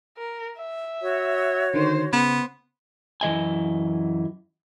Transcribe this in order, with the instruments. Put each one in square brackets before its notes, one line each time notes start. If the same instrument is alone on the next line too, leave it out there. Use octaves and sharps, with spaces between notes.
[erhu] A#4
E5
[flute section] F#4 C#5
[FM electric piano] D3 D#3 [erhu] C5
[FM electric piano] C#3 [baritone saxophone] B3 [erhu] C5
[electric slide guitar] F#2 E3 D#5 G#5